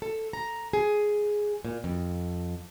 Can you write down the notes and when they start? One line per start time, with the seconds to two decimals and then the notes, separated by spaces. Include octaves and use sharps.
0.02 A4
0.33 A#5
0.73 G#4
1.65 A#2
1.84 F2